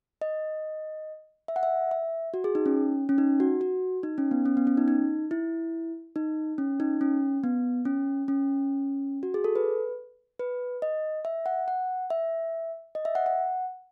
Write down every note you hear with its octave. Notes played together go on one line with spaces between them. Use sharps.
D#5
E5
F#5
E5
E5
F#4
G#4
D#4
C#4
C#4
D#4
F#4
F#4
D#4
C#4
B3
C#4
B3
C#4
D#4
D#4
E4
D#4
C#4
D#4
C#4
B3
C#4
C#4
F#4
G#4
A4
B4
B4
D#5
E5
F#5
F#5
E5
D#5
E5
F#5
F#5